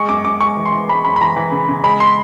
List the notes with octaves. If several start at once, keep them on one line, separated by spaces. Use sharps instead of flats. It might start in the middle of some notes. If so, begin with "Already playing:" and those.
Already playing: G#3 C#6
F#2 D6
F#2 D6
G#3 C#6
E3
C6
E3
G#3 B5
F#2 B5
B5
E3 A#5
E3
C#3
C#3
G#3 B5
C6